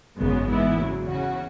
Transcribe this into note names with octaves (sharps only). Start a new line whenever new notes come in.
G#1 F#2 C#3 G#3 B3
G#2 E3 B3 E4
E2 C#3 F#3
E2 C#3 E3 C#4 F#4